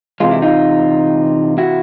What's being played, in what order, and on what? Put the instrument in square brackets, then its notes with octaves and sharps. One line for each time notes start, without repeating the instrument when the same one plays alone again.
[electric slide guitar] C3 E3 G#3 F4
E4
D#4 F4
E4 F#4